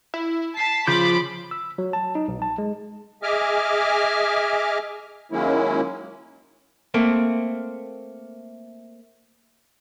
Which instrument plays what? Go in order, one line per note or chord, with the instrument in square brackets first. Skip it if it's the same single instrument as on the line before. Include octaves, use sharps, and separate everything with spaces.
[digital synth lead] E4
[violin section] A5 [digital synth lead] B6 [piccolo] C7
[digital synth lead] C#3 [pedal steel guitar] F3 F4 G6 [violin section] B5 C6 D6 [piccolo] B6
[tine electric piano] E6
F#3
A5
D#4
B1
A5
G#3
[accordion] G#4 D#5 E5 G#5 D6 F6
D#3 F#3 G#3 A#3 C#4 E4
[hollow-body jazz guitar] A3 A#3 C4